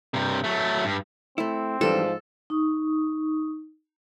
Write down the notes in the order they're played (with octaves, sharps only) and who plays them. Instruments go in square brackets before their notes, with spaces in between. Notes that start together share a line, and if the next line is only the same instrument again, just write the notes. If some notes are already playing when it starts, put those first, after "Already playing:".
[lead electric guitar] G2 C3
F#3 A3
G2
[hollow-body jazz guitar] A3 E4 [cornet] C4
[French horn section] G#2 F3 [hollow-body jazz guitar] E3 G3 D4 [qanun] A4
[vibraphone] D#4 C#6 D#6